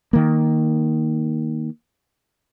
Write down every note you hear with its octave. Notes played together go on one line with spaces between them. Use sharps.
D#3 A#3